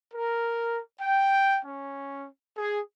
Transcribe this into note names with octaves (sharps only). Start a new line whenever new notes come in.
A#4
G5
C#4
G#4